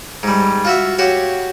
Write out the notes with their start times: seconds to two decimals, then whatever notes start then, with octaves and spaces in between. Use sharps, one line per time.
0.23 G#2 G3
0.65 F4 F#4 E5
0.98 F#4 G4 C#5